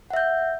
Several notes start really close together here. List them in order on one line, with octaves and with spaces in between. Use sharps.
F#5 E5 G6